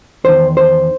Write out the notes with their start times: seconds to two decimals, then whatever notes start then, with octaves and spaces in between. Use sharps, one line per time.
0.24 E2 D#3 C5
0.57 C5